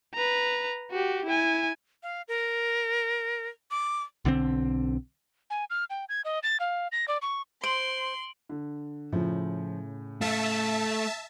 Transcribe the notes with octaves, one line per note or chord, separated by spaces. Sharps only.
B4 A#5
F#4 G4
E4 G#5
F5
A#4
D6
B1 D3 E3 C4
G#5
F6
G5
G#6
D#5
A6
F5
A#6
D5
C#6
C5 C6 D7 F#7
D3
A2 C#3 F3
A3 E5 F5 A5